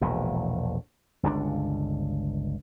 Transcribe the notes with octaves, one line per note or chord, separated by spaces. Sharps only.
E1 A#1 A2
G1 C#2 B2 D4